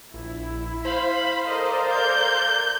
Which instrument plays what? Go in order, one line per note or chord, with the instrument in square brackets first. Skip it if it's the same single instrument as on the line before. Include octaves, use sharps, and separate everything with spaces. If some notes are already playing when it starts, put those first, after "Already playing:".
[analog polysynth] A#1 [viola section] E4
[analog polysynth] C5 F5 [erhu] B5
[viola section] A4 A#4 D5 [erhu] D#5
[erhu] G6